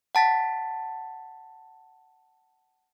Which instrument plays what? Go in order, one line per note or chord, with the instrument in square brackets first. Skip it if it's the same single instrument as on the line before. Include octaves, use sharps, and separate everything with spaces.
[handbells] F#5 A5 A6 B6